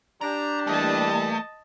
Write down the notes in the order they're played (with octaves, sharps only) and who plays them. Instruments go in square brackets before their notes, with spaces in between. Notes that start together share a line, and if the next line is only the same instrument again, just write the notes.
[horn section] D4 G4 [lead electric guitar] A#5
[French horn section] E3 G3 A#3 [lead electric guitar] A3 [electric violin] D#5 A5